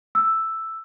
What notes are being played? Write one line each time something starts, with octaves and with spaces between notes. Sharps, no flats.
E6